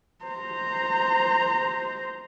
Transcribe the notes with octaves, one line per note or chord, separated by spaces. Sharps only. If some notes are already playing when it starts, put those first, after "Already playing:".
C5 A#5